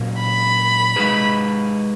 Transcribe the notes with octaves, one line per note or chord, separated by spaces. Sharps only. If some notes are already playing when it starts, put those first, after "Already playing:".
Already playing: A#2 F#3 C#4
B5
G#3 D#4 G#4 B4